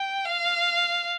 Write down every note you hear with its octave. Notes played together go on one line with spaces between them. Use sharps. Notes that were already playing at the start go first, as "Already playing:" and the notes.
Already playing: G5
F5